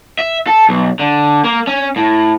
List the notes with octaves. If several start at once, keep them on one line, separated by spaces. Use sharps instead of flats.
E5
A4
B1
D3
A#3
C#4
A2